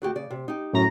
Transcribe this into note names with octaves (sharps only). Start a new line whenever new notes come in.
D2 F#4 G4
C#3 D5
C3
D#4 G4
F#2 A2 A#5 A#6